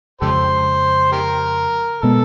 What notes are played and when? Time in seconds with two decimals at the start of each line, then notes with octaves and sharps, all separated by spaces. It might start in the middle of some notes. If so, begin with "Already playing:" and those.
0.21 F2 C#3 F3 G#3 G4 A4 C5
1.12 G4 A#4
2.02 B2 G#3 B3 A4